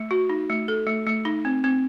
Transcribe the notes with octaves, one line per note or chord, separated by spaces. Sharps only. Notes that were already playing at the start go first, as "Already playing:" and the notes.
Already playing: A3
F#4
D#4
A3
A4
A3
A3
D#4
C4
C4